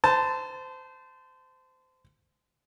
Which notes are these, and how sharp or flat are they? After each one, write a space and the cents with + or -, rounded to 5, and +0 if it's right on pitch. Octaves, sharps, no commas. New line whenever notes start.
C5 -25 A5 +5